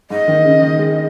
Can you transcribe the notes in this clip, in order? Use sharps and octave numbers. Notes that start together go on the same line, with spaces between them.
G#2 D#5
D#3
C#3
D#3
G#3